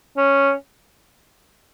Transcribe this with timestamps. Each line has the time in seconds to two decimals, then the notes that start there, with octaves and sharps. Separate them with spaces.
0.17 C#4